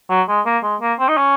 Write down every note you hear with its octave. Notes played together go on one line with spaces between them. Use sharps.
F#3
G#3
A#3
G#3
A#3
C4
D#4
C#4